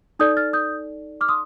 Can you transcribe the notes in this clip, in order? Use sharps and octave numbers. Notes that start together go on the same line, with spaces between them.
D#4 A4 D5 D#6 G6
F6 A6
D#6 G6
D6 F6
C6 D#6